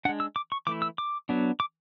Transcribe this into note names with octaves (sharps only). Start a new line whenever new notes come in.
G#3 D4 F#5
E6
D6
C#6
E3 A3 E4 D6
E6
D6
F#3 B3 D4
D6